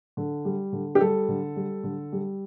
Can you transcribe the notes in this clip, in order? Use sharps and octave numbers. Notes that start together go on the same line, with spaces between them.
D3
G3
D3
G4
G3 A4
D3
G3
D3
G3